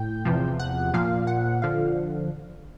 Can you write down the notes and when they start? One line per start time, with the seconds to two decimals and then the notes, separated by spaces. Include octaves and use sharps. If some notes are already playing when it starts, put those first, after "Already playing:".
Already playing: A2 G5
0.25 E2 C3 F3
0.60 F#5
0.94 A#2 F3 F5
1.27 F#5
1.62 D3 F3 F5